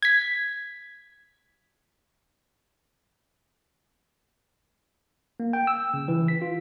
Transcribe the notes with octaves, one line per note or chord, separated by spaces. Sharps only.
G#6 B6
A#3
G5
E6
C#3
E3
B6
F4